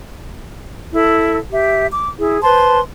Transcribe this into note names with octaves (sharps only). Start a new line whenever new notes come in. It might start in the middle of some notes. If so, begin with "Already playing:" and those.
E4 A4
G4 E5
D6
E4 G#4
B4 C5 A5 C6